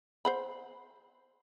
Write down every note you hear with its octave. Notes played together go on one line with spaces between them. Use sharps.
C5 F#5 B5